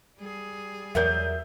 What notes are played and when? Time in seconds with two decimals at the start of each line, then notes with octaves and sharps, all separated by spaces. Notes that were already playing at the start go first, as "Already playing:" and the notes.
0.18 G3 G#4
0.95 E2 F#3 A#4 D5 E5 G6